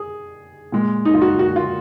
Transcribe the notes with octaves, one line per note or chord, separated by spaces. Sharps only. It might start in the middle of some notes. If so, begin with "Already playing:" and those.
Already playing: G#4
A#2 G#3
D#4
F4
F#4
F#4
F4